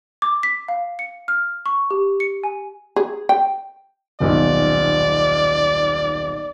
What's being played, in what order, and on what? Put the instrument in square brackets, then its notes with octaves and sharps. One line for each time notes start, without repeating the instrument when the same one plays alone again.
[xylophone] D6
B6
F5
C#7
F6
C#6
G4
C#7
G#5
[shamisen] G#4
G5
[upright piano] D#1 B1 [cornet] D5